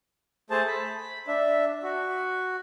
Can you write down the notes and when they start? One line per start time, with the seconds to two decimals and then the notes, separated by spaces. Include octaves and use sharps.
0.50 A3 G#4 C5 A5
0.68 B5
1.28 D4 E5
1.83 F#4